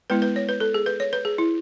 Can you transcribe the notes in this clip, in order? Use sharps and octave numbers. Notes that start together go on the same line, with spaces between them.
G#3 B3 E4 B4
B4
C#5
B4
A4
G#4
B4
C#5
B4
G#4
E4